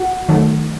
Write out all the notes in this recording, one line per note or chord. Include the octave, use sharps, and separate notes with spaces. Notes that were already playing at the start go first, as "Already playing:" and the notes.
Already playing: F#4 F#5
D#3 F#3 A3